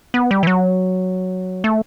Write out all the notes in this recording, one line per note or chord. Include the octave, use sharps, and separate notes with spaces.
B3
G3
E3
F#3
A3